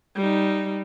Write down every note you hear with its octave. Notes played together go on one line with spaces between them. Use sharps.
G3 D#4